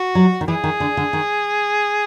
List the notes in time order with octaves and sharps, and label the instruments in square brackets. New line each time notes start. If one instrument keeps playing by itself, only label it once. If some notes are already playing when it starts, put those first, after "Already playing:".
Already playing: [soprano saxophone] F#4
[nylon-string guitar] F#3
D#3
[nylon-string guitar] E3 [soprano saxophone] G#4
[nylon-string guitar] D#3
D3
D3
D#3